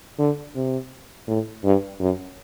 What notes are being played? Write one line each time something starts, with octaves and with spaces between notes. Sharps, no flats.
D3
C3
A2
G2
F#2